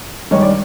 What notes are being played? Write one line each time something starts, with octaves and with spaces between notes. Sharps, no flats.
G2 D#3 G#3 C#5
D5